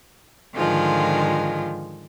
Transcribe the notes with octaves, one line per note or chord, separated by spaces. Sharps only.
G#2 D3 D#3 F3 G#3 F4